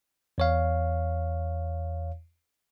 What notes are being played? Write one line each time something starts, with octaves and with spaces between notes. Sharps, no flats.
E2 C#5 F5